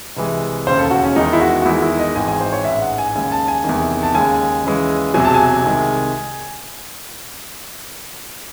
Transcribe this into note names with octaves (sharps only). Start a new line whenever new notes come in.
C2 C3 E3 G#3
E1 D#2 C#3 C5
A4
F#4
C#4
E2 D#3 G#3 D#4
E4
F#4
F#4
E2 D#3 G#3 E4
E4
D#5
G#1 G#2 E3 G#3 G#5
G#5
C5
C#5
A1 G#2 E3 E5
F#5
G#5
D#2 C#3 G#3 G#5
A5
G#5
E2 C3 D#3
A5
D#2 C#3 G#3 G#5
D#2 C#3 E3 G#3
E1 E2 C3 F#3 G#5
A5
G#5
C2 C3 D#3 G#3